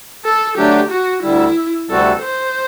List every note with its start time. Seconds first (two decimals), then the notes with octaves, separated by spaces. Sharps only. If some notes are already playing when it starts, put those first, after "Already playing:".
0.25 A4
0.57 D3 F#3 A3 D4 G4
0.91 F#4
1.23 D2 D3 G3 E4
1.89 D2 C3 G3 C4 F#4 A4
2.22 C5